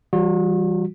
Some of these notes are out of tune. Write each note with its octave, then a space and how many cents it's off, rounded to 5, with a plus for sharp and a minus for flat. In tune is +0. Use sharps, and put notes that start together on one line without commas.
E3 +20 G3 +0 F#4 -45